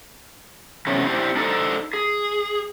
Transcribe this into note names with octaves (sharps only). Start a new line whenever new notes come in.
E2 C3 F#3 C#4 A4
C4 D4 E4 G4 C5
D4 D#4 A4 A#4 C5
G#4